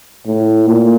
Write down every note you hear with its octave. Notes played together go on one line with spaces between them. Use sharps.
A2
A#2